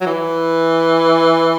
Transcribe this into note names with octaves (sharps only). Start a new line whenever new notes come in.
F#3
E3